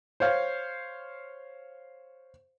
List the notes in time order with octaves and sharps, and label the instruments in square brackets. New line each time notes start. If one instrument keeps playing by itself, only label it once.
[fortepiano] C5 C#5 F5